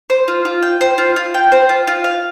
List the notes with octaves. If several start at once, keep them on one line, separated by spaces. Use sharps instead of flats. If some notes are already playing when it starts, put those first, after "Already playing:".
C5
F4
F4
G5
C5
F4
F4
G5
C5
F4
F4
F5